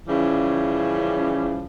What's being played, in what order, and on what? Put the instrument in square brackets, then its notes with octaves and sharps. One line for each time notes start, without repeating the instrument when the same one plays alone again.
[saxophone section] C#3 E3 F3 G3 C#4